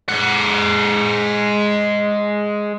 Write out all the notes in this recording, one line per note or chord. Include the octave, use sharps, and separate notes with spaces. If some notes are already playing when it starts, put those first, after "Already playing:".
G#3 F#5